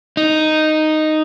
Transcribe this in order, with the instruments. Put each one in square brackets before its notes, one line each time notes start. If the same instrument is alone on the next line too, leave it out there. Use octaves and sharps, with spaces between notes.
[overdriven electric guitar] D#4